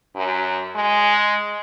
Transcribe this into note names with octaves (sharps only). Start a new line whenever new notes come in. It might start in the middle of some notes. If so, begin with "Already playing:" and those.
F#2
G#3